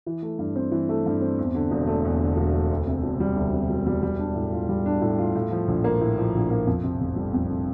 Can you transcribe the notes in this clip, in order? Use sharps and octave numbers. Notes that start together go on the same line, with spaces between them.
E3
A3
G2
C4
E3
A3
G2
C4
E2
D3
E1
A3
E2
D3
E1
A3
D2
C3
E1
G3
D2
C3
E1
G3
G3
D4
A2
F4
G3
D4
A2
F4
A2
F3
A#1
A#3
A2
F3
A#1
A#3
F2
C3
F1
G3
F2
C3